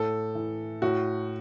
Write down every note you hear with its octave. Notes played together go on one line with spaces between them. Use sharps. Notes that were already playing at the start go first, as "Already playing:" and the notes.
Already playing: A2 A4
E3
A2 F#4